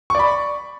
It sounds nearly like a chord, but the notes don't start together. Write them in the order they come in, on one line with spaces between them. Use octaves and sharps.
C#6 D5 B5